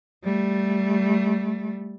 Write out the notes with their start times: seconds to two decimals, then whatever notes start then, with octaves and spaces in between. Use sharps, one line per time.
0.24 G3 A3